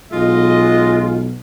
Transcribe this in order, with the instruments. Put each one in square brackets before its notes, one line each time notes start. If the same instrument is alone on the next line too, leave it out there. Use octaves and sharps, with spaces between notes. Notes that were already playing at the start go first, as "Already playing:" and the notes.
[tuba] B1 [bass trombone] G#3 [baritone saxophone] F4 [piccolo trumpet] D#5